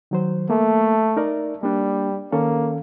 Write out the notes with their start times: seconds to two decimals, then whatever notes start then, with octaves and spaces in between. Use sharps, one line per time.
0.11 D#3 F#3 C5
0.50 A3 A#3
1.17 D#4 A#4 D5
1.63 G3 A#3 D4
2.32 D#3 A#3 C#4 A4